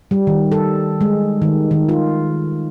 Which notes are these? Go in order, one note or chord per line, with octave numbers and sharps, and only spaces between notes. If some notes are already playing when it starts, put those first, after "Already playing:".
G3
D#3
A4
G#3
D#3
D#3
F4